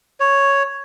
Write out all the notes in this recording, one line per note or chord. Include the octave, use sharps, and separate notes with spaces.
C#5